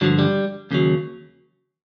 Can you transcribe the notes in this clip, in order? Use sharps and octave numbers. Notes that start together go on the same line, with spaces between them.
G2 D3 F3 F#3
G3
D#2 C#3 F#3